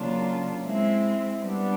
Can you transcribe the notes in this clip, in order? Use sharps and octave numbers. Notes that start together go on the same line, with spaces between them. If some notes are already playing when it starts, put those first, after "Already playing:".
Already playing: C#3 F#3 A#3 D4 F4
G#3 C4 E4
G3 B3 D4